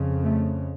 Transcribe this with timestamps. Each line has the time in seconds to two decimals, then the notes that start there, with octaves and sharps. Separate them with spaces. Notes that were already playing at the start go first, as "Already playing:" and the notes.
Already playing: F2 C#3
0.24 A3